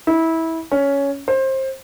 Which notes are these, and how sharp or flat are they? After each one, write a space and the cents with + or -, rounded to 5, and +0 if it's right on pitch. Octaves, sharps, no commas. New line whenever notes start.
E4 -20
C#4 +10
C5 +25